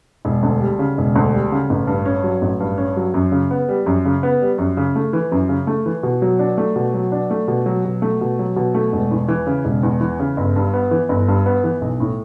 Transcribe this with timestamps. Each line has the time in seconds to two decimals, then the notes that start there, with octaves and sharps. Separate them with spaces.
0.25 E1
0.43 D2
0.61 G3
0.79 C#3
0.98 E1
1.16 D2
1.33 G3
1.52 C#3
1.70 A1
1.87 G2
2.05 C#4
2.24 F#3
2.42 A1
2.60 G2
2.78 C#4
2.97 F#3
3.14 F#2
3.32 C#3
3.51 B3
3.69 G3
3.86 F#2
4.05 C#3
4.23 B3
4.41 G3
4.58 F#2
4.77 C#3
4.96 A3
5.13 E3
5.32 F#2
5.49 C#3
5.67 A3
5.86 E3
6.03 B2
6.22 F#3
6.39 D4
6.58 A3
6.76 B2
6.94 F#3
7.12 D4
7.31 A3
7.48 B2
7.66 F#3
7.85 B2
8.02 A3
8.21 B2
8.39 F#3
8.56 B2
8.74 A3
8.93 E1
9.11 E2
9.28 E3
9.47 C#3
9.65 E1
9.83 E2
10.01 E3
10.20 C#3
10.37 G1
10.56 G2
10.74 B3
10.91 E3
11.09 G1
11.28 G2
11.46 B3
11.64 E3
11.81 B1
12.00 A2